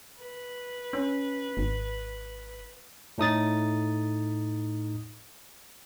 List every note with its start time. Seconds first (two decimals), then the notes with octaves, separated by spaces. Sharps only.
0.19 B4
0.93 C#4
1.57 G#1
3.18 A2 D#4 D#6 A6